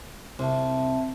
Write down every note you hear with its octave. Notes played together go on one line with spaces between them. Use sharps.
C2 C4 E5 A5